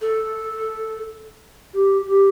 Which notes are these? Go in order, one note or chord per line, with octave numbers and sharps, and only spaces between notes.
A4
G4
G4